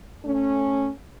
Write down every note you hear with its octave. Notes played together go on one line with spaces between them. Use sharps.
A3 C#4